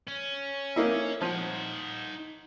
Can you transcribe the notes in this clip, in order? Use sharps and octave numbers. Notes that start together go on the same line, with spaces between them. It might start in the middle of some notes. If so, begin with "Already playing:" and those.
C#4
A#3 D#4 E4
F3 D#4 F#5